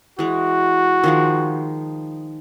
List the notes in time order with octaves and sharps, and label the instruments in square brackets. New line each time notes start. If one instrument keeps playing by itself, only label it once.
[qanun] E3 G#3 [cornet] F#4
[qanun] D#3 F3 G#3